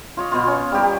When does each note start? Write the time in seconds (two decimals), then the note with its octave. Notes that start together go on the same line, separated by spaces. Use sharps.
0.17 F4 C#5 D#5
0.32 B2 B3 F4
0.47 C#4
0.72 G3 B3 G4 A#4
0.83 G4